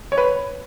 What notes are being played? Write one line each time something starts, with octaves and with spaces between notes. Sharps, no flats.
C#5
B4